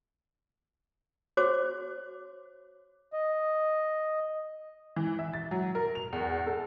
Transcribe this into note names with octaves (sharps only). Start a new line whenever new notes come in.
F#4 C5 C#5 D6
D#5
E3
E5
A6
F#3
A#4
F7
E2
A4